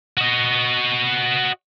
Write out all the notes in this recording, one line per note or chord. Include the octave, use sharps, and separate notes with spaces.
F#4 D#5